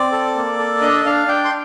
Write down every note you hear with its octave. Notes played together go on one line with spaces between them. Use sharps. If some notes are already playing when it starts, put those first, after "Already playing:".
Already playing: C4 D5
A4
A#3
A4
D4 D#5
D4 F5
D4 G5
C6